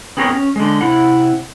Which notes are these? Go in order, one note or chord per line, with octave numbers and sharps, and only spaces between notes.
B3 C4 G#4 A#4 C#5
C#4
D3 G#3
C3 E4 F#5